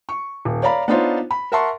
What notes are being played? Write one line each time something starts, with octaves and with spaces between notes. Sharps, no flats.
C#6
D#1
C#5 D5 F5 A#5 B5
B3 D4 D#4 F4 C5 C#5
B5
A#4 E5 F#5 A5 C6 C#6